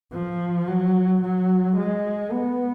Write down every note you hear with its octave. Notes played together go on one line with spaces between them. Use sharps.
F3
F#3
F#3
G#3
B3